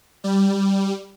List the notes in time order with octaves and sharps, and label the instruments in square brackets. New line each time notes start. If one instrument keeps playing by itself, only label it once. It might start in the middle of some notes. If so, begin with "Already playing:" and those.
[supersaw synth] G3